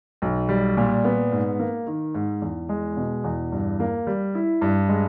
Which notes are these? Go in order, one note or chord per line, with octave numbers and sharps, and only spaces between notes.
B1
G3
A#2
B3
G#2
A#3
D#3
G#2
E2
G#3
B2
E2
G2
A#3
G3
E4
G2
G#3